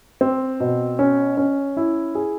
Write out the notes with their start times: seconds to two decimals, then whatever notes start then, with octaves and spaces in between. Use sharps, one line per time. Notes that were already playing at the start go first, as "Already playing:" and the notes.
0.21 C4
0.60 B2
0.99 C#4
1.37 C#4
1.77 E4
2.15 G#4